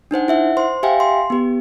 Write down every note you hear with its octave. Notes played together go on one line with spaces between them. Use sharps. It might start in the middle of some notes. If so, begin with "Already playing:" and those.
D4 D#4 C5 F#5
E4 E5 F#5
C5 C6
G4 E5 F5 G5 G#5
C6
B3 G4